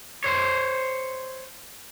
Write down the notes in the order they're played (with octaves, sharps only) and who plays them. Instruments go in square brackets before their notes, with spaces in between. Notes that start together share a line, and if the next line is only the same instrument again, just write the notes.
[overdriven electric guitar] C5 C#5